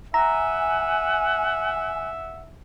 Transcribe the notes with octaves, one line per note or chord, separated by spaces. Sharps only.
E5 F#5 G#5 A#5